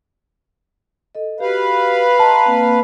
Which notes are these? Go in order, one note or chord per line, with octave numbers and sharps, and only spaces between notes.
A4 D#5
F#4 G4 B4 F5
D#5 A5 A#5 C6
A#3 C4